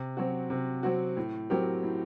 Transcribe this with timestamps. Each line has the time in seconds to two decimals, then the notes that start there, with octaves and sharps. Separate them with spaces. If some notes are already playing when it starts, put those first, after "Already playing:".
Already playing: C3
0.17 F#3 C4 F#4
0.50 C3
0.83 F#3 C4 F#4
1.17 A2
1.50 F#3 C4 G4 A#4
1.83 A2